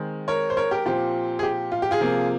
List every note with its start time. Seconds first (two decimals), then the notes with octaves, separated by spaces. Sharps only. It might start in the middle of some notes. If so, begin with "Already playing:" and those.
Already playing: D#3 G#3 C4
0.28 A#4 C#5
0.50 C5
0.57 A#4 C#5
0.71 G4 A#4
0.86 A#2 F3 C4 G4
1.39 G#4
1.43 G4
1.72 F4
1.82 G4
1.91 F4 G#4
2.01 C3 F3 A#3